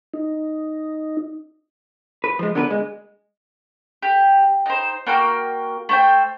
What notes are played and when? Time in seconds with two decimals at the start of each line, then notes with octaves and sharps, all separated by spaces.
0.14 D#4
2.24 B4
2.39 F3 G#3
2.55 D3 B3 A#4 B4
2.70 G#3
4.02 G4
4.66 D#4 C5
5.07 A#3 F#4 G5 F6
5.89 A3 C5 G5